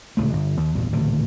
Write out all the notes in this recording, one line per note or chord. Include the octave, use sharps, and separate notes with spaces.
D1 C#2 A3
G1
D#2
A#1 E2 G2
A1 D2 A#2 D#3